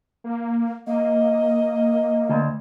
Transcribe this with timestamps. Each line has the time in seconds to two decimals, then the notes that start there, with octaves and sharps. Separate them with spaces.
0.24 A#3
0.87 A#3 D#5
2.29 D2